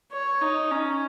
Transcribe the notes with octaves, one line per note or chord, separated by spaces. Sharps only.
C#5
D#4
C#4